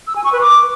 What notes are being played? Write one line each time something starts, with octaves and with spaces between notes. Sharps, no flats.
E6
G#5
C#6
B4
D6